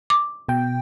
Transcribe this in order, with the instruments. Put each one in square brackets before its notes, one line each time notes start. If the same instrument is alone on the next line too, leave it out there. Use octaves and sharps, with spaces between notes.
[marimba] D6
[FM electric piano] B2 G5